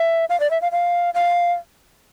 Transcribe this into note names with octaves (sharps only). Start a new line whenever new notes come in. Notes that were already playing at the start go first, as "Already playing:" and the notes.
Already playing: E5
F5
D5
E5
F5
F5
F5